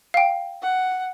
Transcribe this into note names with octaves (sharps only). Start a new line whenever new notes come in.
F5 G5
F#5